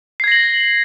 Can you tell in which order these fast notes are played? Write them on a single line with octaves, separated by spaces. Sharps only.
C7 G#6 A#6 F#7